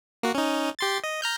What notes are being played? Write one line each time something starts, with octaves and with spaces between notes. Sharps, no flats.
A#3 F#4
C#4 D#4
G4 C6 A6
D#5
A#5 F6 G6